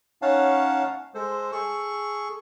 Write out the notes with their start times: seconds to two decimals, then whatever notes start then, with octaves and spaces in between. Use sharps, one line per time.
0.22 C#4 D#4 C#5 F5 F#5 A5
1.14 G#3 A4 C5
1.52 G#4 A4 C#6